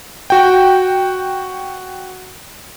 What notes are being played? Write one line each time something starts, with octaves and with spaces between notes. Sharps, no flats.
F#4 G5